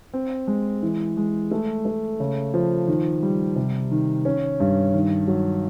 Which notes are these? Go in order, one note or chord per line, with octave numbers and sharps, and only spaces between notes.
C4
G#3
E3
G#3
A3
A3
C#3
F3
D#3
G3
C3
D#3
C#4
G2
D#3
F#3